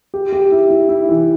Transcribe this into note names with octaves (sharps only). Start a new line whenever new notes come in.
G4
G4
E4
E4
E4
E3